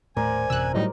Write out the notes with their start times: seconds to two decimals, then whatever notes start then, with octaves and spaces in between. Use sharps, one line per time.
0.17 D#1 A2 A3 A#4 C5 D5 G#5
0.50 A1 F#2 C3 E6 F#6
0.74 A2 F#3 G3 D#4